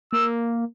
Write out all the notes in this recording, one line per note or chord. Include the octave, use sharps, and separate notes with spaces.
A#3 E6